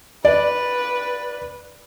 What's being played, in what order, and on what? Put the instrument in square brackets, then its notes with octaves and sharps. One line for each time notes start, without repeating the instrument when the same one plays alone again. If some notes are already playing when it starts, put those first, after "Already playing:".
[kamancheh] B4 [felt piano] D5